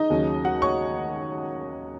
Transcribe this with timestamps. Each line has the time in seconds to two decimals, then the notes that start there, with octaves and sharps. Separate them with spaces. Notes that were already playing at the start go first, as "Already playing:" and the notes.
Already playing: D#4 D#5
0.10 D#2 C#3 F#3 C#4
0.44 F#4 F#5
0.62 C#5 C#6